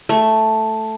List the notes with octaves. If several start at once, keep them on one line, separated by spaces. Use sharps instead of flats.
A3